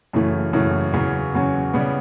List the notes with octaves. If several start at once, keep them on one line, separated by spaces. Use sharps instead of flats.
F#2 C#3 E3 A3
F#2 C#3 E3 A3
E2 C#3 F#3 C#4
E2 C#3 F#3 C#4
C#3 G3 B3